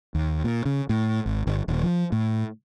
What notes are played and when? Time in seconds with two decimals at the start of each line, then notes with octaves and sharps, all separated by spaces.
0.15 D#2
0.44 A#2
0.66 C#3
0.89 A2
1.26 G#1
1.47 G1
1.68 D#1
1.83 F3
2.12 A2